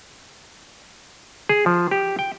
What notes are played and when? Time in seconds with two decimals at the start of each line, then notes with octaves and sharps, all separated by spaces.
1.49 G#4
1.66 F3
1.91 G4
2.19 G5